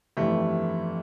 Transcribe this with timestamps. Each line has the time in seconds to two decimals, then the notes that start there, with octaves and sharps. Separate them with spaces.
0.17 G1 F2 E3 G3 A3